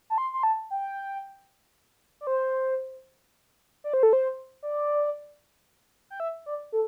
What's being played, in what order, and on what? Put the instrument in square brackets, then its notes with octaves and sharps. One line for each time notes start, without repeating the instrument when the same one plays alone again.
[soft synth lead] A5
C6
C6
A5
G5
D5
C5
D5
C5
A4
C5
D5
G5
E5
D5
A4